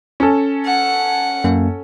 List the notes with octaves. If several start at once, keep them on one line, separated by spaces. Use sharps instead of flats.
C#4 A4
F#5
F#2 A#3